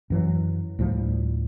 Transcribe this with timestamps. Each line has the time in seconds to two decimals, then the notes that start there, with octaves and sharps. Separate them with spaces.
0.10 F#2 E3 F#3
0.79 D2 A2 F3 G3